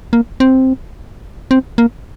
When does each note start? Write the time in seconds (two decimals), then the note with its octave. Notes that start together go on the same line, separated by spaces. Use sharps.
0.13 A#3
0.40 C4
1.51 C4
1.78 A#3